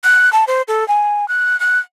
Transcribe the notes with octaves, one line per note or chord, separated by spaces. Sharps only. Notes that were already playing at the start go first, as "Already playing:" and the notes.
F#6
A5
C5
A4
G#5
F#6
F#6